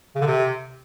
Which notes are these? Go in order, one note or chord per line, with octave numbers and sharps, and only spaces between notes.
C#3
D3
C3